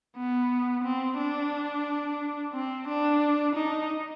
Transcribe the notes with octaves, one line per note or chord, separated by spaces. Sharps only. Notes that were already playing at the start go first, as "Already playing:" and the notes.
B3
C4
D4
C4
D4
D#4